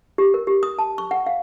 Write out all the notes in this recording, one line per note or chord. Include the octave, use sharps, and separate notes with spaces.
G4
A#4
G4
D#6
A5
C#6
F#5
F5